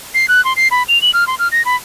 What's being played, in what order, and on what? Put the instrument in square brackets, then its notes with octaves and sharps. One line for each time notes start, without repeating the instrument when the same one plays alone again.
[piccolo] C7
F#6
C6
C7
B5
F7
F#7
F6
C6
F6
A#6
B5